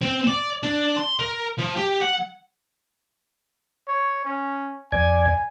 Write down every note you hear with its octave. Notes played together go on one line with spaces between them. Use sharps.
C4
D5
D4
C6
A#4
F3
G4
F#5
C#5
C#4
F2 D5 G#5 G#6